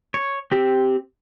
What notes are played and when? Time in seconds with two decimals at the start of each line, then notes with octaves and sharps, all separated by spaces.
0.14 C#5
0.52 C4 G4 E6